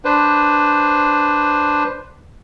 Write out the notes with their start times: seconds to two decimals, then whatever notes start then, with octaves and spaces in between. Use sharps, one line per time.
0.05 D4 B4 C5